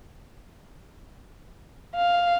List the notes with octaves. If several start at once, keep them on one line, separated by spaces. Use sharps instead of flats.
F5